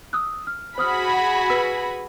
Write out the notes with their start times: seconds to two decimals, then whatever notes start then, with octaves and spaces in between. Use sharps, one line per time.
0.13 D#6 E6 F#6
0.47 F6
0.78 F#4 G#4 C5 B5 D#6 F6
1.14 F#5
1.49 B4 E6 B6